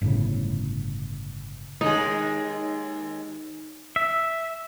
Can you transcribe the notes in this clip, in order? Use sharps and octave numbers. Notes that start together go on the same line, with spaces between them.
G1 A2 C#3
D#2 G#3 D#4 G#4
E5